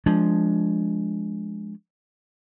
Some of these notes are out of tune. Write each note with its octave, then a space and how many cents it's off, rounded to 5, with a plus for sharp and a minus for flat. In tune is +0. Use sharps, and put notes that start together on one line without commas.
F3 +0 G#3 +10 D4 -10